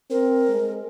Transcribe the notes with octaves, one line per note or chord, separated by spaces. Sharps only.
C4 A#4
G#3